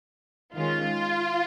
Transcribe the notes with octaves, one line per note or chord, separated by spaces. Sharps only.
D#3 G#3 C#4 F4